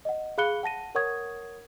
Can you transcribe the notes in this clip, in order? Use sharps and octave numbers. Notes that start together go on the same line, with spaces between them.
D#5 F#5
G#4 F5 B5 F#6 C#7 G7
F#5 A5 A#6 D#7
A#4 C#5 F#5 C#6 D#6 G#6